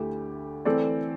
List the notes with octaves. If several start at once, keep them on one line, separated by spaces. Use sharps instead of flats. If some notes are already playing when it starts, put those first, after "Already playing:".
Already playing: D2 D3 A3 E4 G4
E3 A3 C4 A4 D5